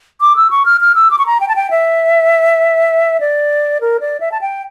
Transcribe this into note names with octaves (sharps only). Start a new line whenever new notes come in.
D6
E6
C#6
F6
F6
E6
D6
C#6
A#5
G5
A5
G5
E5
D5
A#4
D5
E5
A5
G5